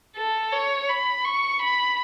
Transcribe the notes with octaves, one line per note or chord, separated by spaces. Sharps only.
A4
C#5
B5
C#6
B5